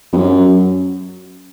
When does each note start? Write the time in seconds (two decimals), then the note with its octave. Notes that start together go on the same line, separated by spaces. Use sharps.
0.13 F2
0.17 F#2